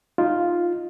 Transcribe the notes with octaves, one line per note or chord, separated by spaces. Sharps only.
D#4 F4